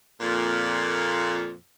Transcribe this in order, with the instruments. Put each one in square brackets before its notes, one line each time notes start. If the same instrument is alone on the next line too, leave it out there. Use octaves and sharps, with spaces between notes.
[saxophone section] F2 A#2